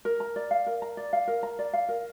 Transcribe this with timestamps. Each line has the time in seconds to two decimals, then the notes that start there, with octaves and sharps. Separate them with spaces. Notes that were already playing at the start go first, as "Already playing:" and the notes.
0.05 A#4
0.20 A#5
0.36 D5
0.51 F5
0.67 A#4
0.82 A#5
0.97 D5
1.13 F5
1.28 A#4
1.43 A#5
1.59 D5
1.73 F5
1.89 A#4